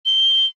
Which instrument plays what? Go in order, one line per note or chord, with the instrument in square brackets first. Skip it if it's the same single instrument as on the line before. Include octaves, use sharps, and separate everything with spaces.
[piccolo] G7